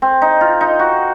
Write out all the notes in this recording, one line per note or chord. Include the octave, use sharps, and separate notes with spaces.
C4
D#4
F4
D#4
F#4